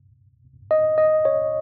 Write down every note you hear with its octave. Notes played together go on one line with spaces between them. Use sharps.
D#5
D#5
C#5